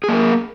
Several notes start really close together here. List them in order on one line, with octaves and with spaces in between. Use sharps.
G#4 A#3 A#4